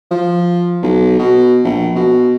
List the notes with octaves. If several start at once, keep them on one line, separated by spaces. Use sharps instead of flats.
F3
B1
B2
A#1
B2